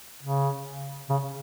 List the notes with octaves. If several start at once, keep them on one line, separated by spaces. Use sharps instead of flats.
C#3
C#3